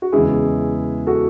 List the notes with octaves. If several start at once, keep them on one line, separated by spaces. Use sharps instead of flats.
F#4
E2 C#3 E3 G#3 E4 G#4
F#4 A4